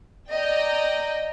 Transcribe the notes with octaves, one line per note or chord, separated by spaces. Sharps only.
D5 D#5 G5 A#5